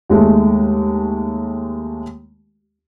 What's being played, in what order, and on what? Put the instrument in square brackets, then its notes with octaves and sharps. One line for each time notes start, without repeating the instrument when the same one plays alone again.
[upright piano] D#2 G#3 A3